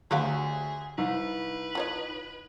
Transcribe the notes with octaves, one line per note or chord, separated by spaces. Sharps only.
D2 F#3 G4 G#4 F5
C2 D#4 B4
F4 C#5 D#5